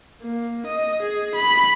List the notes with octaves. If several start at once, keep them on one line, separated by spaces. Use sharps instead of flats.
A#3
D#5
G#4
B5